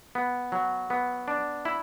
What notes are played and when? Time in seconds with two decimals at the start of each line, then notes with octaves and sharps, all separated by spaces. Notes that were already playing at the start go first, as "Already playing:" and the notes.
0.15 B3
0.52 F#3
0.90 B3
1.28 D4
1.65 E4